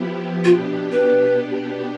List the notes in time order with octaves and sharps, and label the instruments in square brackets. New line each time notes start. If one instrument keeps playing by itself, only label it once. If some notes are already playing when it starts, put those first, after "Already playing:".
Already playing: [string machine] F3 B3 E4 G4
[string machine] B2 B3 D4 G4 [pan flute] F4
[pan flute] B4